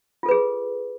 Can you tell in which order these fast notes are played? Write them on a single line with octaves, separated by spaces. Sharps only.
F4 A4 B4 G#4